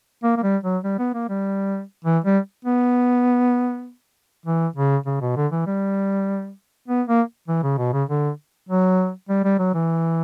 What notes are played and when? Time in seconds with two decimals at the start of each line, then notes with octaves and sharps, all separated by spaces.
0.24 A#3
0.37 A#3
0.43 G3
0.64 F#3
0.84 G3
0.99 B3
1.14 A#3
1.29 G3
2.04 E3
2.24 G3
2.65 B3
4.46 E3
4.76 C#3
5.06 C#3
5.21 B2
5.36 D3
5.52 E3
5.67 G3
6.88 B3
7.08 A#3
7.48 E3
7.63 C#3
7.78 B2
7.93 C#3
8.09 D3
8.69 F#3
9.29 G3
9.44 G3
9.59 F#3
9.74 E3